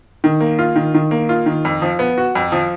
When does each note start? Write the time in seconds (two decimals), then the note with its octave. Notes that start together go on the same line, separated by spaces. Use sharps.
0.24 D#3
0.40 A#3
0.59 F4
0.76 D#3
0.94 D#3
1.11 A#3
1.29 F4
1.46 D#3
1.65 F2
1.82 F3
1.99 B3
2.18 F#4
2.35 F2
2.52 F3